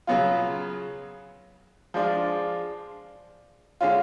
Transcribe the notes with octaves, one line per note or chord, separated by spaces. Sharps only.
C#3 F#3 B3 F4
F3 G#3 D4 F4
D3 G#3 C#4 F4